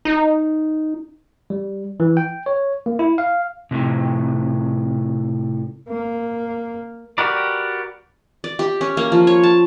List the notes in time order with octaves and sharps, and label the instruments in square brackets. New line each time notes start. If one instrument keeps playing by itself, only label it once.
[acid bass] D#4
[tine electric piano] G3
E3
G5
C#5
A#3
E4
F5
[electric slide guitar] A2 C3
[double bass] A#3
[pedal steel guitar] F#4 G4 A#4 B4 D5
[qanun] D5
G4
C#4
A#3
F3
C#5
A5